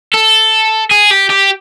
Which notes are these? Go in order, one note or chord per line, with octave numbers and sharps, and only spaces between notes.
A4
G#4
G4
G4